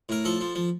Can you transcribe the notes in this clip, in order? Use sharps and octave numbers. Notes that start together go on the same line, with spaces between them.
A2 A#4
F3 A4
F3
F3